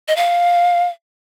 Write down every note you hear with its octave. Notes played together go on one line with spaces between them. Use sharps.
D#5
F5